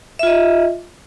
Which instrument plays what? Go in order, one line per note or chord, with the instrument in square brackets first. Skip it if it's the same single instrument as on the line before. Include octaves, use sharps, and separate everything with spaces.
[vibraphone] E5
F4
D#5